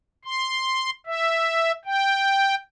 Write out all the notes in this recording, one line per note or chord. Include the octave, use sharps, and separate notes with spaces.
C6
E5
G5